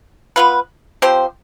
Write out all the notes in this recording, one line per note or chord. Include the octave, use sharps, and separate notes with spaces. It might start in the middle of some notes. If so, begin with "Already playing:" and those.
B3 F4 B4
F3 C4 G4 C5